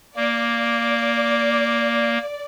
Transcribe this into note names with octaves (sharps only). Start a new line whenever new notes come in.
A#3 D5